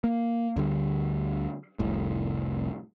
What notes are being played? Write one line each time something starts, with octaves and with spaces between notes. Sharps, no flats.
A#3
D2 D3 G3
F1 C2 A2